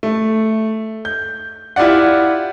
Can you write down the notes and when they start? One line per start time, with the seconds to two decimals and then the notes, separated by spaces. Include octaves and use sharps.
0.03 A3
1.05 G6
1.76 E4 F4 G4 D5 F#5